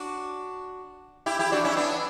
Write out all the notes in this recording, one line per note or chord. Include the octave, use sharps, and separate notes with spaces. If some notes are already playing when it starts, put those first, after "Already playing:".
Already playing: D4 F#4
E4 G4
E4 G4
D4 F#4
C#4 E4
B3 D4